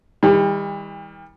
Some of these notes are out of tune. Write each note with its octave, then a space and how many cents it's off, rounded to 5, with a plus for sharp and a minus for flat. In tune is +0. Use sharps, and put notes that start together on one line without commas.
E3 -45 G3 +35